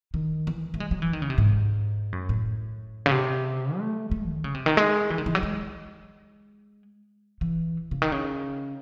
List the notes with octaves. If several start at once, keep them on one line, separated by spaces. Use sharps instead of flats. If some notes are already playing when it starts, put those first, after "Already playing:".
D#3
E3
A3
G#3
F#3
E3
D#3
C#3
C3
G#2
F#2
A2
C#3
C3
A3
A3
D#3
C#3
C3
D#3
G#3
E3
D#3
E3
F#3
G#3
E3
C#3
D#3
C#3